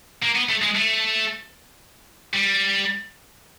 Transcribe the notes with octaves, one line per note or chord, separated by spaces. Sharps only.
A#3
B3
A3
G#3
A3
G3